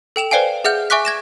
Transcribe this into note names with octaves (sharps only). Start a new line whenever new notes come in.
A4 G5 E7 F7
B4 C5 D5 F5 G5 G#5
G#4 E5 F#5 F6 G6
E5 G#5 C#6 D6 F#6 B6
G#6 A#6 E7